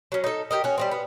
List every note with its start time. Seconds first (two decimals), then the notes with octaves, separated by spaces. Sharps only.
0.12 F#3 C#4
0.24 D#4 A4
0.51 G4 A#4 D#5
0.64 C#4 F#4
0.78 G3 G#3 C4
0.91 B3